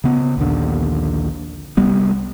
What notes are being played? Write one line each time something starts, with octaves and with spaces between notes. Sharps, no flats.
C#3 B3
A#1 D#2 D3
C2 G3 B3